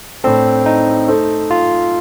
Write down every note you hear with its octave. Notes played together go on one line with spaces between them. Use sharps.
A2 A3 C4 D4 A4
D#4
A3 D#4 A4 C5
F4